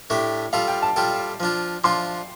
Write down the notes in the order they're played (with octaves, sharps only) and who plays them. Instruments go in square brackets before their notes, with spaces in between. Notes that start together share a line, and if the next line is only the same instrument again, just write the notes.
[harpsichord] A2 A3 D4 G4
[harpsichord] G3 F4 A4 [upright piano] F5
[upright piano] G5
A5
[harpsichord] G3 F4 A4 [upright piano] G5
[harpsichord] F3 D4 F4
[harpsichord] F3 D4 F4 [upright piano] C6